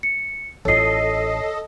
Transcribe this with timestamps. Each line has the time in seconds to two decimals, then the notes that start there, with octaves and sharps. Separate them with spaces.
0.03 C#7
0.65 A1 F4 A4 C#5 D#5 C7